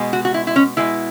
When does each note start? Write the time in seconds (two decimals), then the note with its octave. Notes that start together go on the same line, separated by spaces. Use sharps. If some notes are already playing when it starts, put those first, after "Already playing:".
Already playing: B2 G#3 B3
0.13 F#4
0.25 F#4
0.34 E4
0.47 E4
0.56 C#4
0.77 B2 G#3 B3 E4